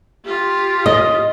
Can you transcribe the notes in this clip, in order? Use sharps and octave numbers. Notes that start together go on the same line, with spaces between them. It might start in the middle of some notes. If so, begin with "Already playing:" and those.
F4 G4
D#5